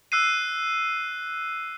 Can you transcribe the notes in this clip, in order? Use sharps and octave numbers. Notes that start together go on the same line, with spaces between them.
E6 F#6 C7 D#7